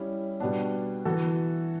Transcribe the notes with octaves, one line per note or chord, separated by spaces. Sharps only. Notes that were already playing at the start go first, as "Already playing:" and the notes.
Already playing: G3 C#4 E4
B2 G3 B3 D4
E3 B3 F#4 A4